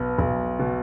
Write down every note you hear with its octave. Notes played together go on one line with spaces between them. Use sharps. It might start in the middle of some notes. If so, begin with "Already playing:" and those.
Already playing: B1 B3
B1
B2